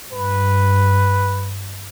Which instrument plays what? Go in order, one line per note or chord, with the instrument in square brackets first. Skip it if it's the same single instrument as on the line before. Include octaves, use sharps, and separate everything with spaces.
[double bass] G2 [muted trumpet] B4